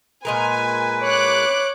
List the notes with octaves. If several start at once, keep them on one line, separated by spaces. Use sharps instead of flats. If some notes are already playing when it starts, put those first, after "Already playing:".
A#2 G#3 A#4 B4 G#5
C#5 D6 F#6